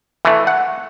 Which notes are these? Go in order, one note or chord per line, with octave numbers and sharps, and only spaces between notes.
E3 A3
F#5